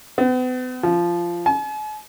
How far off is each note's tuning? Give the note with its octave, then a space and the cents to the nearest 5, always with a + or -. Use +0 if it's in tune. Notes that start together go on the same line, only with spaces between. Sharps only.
B3 +40
F3 -15
G#5 +45